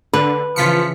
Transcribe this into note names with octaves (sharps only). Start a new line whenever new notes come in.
D3 B4
C#3 E3 F3 F4 B6 C#7